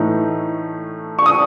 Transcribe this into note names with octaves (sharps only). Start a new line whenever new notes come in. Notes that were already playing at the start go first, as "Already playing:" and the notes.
Already playing: A2 E3 A3 D#4
C#6
D#6